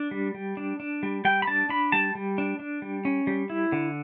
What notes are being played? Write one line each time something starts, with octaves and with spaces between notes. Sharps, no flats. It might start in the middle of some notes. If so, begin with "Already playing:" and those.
Already playing: D4
G3
G3
D4
D4
G3
G3 G5
B5
D4 A5
D4 B5
G3 A5
G3
D4
D4
G3
C#4
G3
E4
D3